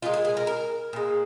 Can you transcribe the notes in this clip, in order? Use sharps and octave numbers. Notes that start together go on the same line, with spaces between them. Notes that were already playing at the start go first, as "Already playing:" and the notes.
A#2 G#3 F4
G#4
G#4
A#4
A#4
A#2 G#3